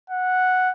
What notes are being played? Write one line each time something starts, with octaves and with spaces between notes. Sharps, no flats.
F#5